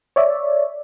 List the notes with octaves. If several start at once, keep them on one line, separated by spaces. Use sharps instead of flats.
C#5 D5 E5